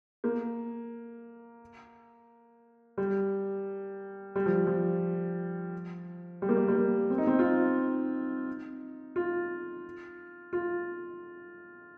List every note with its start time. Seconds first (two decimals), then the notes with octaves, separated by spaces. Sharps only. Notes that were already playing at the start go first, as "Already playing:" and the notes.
0.24 A#3
2.98 G3
4.36 G3
4.46 F3
4.67 F3
6.42 G3
6.49 A#3
6.57 G3
6.68 G3
6.75 A#3
7.10 C4
7.18 D#4
7.27 C4
7.39 F4
7.44 D#4
9.16 F4
10.53 F4